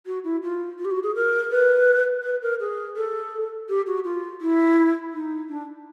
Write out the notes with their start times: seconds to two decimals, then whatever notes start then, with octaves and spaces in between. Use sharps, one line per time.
0.06 F#4
0.24 E4
0.43 F4
0.79 F4
0.85 G4
0.91 F#4
1.03 G#4
1.15 A#4
1.51 B4
2.24 B4
2.42 A#4
2.60 G#4
2.96 A4
3.69 G4
3.87 F#4
4.05 F4
4.41 E4
5.14 D#4
5.49 D4